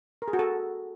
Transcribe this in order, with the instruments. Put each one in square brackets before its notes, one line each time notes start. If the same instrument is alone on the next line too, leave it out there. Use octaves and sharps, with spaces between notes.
[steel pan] A#4
G#4
F#4
A4